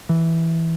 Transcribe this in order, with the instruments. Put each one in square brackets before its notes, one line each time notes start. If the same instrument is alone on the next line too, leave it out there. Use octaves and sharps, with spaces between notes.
[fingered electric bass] E3